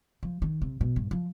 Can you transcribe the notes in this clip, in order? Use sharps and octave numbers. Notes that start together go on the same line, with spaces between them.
F3
D#3
C3
B2
G2
F3